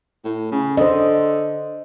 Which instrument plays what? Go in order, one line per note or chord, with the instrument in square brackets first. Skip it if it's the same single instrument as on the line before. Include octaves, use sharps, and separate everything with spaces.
[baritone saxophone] A2
C#3
[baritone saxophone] D3 [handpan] C5 D#5